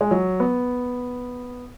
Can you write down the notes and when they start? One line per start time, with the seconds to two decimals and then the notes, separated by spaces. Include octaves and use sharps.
0.01 G#3
0.11 F#3
0.40 B3